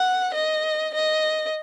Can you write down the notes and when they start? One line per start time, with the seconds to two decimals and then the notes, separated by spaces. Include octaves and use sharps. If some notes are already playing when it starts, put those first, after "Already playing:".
Already playing: F#5
0.34 D#5
0.94 D#5